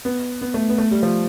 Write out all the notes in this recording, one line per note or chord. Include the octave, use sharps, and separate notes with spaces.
B3
B3
A3
B3
A3
G3
F3